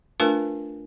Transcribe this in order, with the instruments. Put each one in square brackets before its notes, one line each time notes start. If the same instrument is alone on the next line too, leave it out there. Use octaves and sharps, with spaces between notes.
[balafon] A3 D4 F4 A#4 B4 G#5